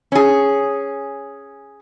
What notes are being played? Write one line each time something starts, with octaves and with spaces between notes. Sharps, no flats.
C#4 G#4